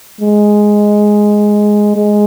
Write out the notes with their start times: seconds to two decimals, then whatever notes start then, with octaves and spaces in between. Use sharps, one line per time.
0.21 G#3
1.96 G#3